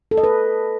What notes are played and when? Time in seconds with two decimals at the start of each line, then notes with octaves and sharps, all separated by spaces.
0.11 A4
0.17 D#5
0.24 B4